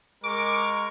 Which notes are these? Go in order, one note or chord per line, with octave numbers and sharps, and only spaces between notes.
G#3 A#4 C#6 D6